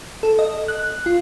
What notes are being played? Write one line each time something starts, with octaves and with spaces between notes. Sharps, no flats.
A4
D#5
F#6
F4